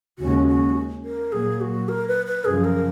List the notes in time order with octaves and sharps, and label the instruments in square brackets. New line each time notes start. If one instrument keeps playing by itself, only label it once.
[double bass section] D#2 C#3 G#3 C#4 [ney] F#4
[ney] F#4
A#4
[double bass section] A#2 F#3 A#3 [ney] G#4
[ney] F#4
A#4
B4
B4
[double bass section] F#2 C#3 F3 [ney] G#4
[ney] A#4